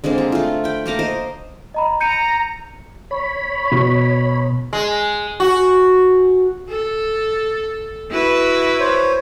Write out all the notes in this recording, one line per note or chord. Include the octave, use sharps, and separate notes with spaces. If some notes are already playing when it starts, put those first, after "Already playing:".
D3 G#3 A#3 C4
G#4
A3 F4
G5 B5
A3 A#3 A#5 D6
A#4 C5 D#5
D#5 A#5 B5
A#5 G6 C#7 D#7
C#5 B5
B2
G#3
F#4
A4
E4 F#4 B4
C5 C#5